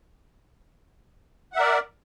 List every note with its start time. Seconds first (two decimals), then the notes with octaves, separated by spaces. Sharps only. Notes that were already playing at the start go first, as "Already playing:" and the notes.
1.53 F#5
1.55 E5
1.58 A#4
1.61 D5